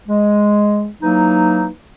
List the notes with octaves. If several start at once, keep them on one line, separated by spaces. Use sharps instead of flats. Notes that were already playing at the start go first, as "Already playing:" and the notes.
G#3
E3 F#3 A#3 D#4